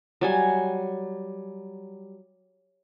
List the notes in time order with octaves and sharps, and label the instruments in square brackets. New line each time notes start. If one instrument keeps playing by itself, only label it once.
[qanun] F#3 G3 G#5